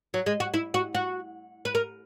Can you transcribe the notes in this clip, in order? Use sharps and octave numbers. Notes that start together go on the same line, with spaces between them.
F#3
G#3
F#4
E4
F#4
F#4
B4
A#4